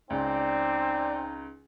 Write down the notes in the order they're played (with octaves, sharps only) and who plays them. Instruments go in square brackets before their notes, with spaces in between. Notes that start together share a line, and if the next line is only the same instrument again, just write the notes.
[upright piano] C#2 [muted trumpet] C4 [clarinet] D#4 [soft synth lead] D5